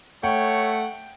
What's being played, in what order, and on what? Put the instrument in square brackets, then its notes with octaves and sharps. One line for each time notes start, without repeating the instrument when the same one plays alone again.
[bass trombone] A3 [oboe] C#5 [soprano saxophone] F#5 [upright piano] G5